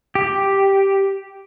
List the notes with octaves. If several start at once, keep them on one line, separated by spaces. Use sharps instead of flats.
G4